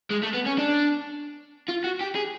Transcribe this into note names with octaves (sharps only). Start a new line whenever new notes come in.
G#3
A3
B3
C#4
D4
F4
F#4
G4
G#4